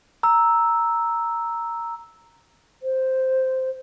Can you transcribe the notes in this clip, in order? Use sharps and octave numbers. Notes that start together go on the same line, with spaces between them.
A#5 E6
C5